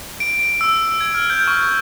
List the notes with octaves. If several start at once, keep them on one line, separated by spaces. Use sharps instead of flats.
D7
D7
E6
G#6
F6
G6
C#6